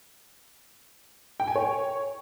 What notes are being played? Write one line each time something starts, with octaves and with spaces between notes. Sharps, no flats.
G5
G#5
C#5